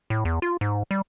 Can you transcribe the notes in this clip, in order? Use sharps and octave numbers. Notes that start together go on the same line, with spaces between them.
A2
E2
F4
G#2
G3